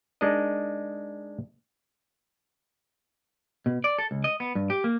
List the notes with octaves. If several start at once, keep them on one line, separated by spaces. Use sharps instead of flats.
G#3 D4 D#4 A#4 D#5
B2
D5
A4
C#2
D#5
B3
G2
G4
A#3